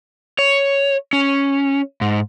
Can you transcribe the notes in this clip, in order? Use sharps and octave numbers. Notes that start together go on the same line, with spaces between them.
C#5
C#4
G#2